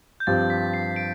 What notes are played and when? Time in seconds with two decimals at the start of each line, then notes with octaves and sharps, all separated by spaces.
0.20 G6
0.27 G2 F3 C4 G4 A6
0.50 B6
0.74 C7
0.96 D7